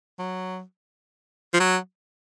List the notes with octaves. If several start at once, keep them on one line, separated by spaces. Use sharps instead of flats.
F#3
F3
F#3